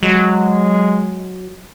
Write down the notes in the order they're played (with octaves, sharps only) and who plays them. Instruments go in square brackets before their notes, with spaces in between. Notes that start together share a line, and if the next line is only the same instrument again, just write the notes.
[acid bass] F#3 [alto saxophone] G#3